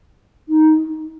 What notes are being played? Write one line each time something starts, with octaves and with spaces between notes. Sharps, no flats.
D#4